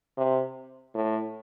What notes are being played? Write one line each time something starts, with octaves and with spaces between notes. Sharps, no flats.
C3
A2